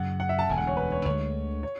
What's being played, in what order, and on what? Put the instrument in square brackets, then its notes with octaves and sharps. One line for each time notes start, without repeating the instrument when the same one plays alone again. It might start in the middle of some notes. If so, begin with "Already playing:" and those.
Already playing: [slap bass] F#2 C#3 F#3 [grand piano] F#5
[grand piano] F#5
E5
A5
[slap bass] E1 D2 D3 [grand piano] G#5
[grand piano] F#5
C#5
B4
C#5
[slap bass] D2 D3 G#3 [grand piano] C#5
[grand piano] C#5